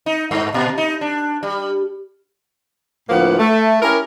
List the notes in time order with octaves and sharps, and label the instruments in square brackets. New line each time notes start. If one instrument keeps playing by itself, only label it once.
[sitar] D#4
G2
A#2
D#4
D4
G3
[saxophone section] D2 A2 F3 A#3 B3 F#5
A3
C#4 E4 G4 A#4